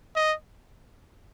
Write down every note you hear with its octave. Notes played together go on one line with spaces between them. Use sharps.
D#5